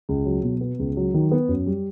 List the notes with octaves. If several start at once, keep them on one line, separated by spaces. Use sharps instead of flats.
C#2
F#3
B2
B3
C#2
F#3
D#3
B3
F#2
G3